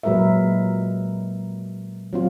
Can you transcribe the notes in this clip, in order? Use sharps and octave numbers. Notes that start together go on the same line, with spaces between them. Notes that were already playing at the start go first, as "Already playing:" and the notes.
A#2 F#3 G#3 A#4 B4 E5
F#3 C4 F4